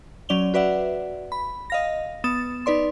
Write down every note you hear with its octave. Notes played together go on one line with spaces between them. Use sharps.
F#3 C#4 D5 F7 G7
F#4 B4 D5 E5 F#5
B5
D#5 F5 A#6
B3 D#6 A6 E7
D#4 B4 D5 C6